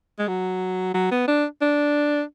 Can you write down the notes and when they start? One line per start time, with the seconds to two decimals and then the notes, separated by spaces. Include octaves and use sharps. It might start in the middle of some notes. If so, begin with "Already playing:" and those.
0.19 G#3
0.28 F#3
0.94 F#3
1.11 B3
1.27 D4
1.61 D4